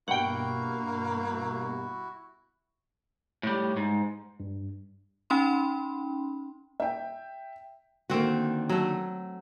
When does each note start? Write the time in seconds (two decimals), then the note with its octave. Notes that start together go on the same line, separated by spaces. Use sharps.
0.08 G2 B2 A#3 E4 F#4 F#5 G5
3.43 A2 G3
3.77 G#2
4.40 G2
5.30 C#4 D#4 G5 B5 C6
6.80 E5 G5
8.10 D3 D#3 A#3 C4 F#4
8.69 F#3 A3